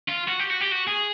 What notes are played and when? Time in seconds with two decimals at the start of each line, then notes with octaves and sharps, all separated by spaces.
0.08 F4
0.28 F#4
0.39 G4
0.50 F#4
0.61 G4
0.71 F#4
0.87 G#4